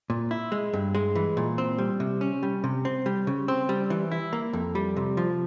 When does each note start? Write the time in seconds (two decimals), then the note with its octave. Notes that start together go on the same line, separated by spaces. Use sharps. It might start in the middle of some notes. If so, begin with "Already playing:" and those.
0.10 A#2
0.31 E4
0.52 G#3
0.73 G2
0.95 G#3
1.15 E3
1.37 A#2
1.58 C4
1.79 G3
2.00 C3
2.21 C#4
2.43 G3
2.64 C3
2.85 C4
3.06 G3
3.27 C#3
3.48 C4
3.69 G3
3.90 E3
4.12 E4
4.33 A#3
4.53 F2
4.75 G3
4.96 C3
5.17 F3